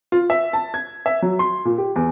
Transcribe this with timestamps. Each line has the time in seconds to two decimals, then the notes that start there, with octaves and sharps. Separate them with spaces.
0.12 F4
0.30 E5
0.53 A5
0.74 G#6
1.06 E5
1.22 F#3
1.39 C6
1.65 A#2
1.78 G4
1.96 E2